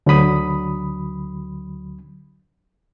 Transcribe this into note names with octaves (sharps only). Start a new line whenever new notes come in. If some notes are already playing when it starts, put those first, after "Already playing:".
D2 D3 F#3 B5 D#6